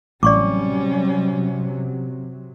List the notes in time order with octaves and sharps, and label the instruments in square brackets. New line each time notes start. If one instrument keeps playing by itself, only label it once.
[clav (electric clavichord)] A1 [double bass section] C3 F#3 [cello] G3 C#4 [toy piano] D5 C#6 D6